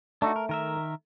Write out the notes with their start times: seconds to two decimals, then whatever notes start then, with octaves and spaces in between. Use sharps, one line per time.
0.22 A3 D4 D#4 F#4
0.36 A#4
0.49 D#3 A#4 E5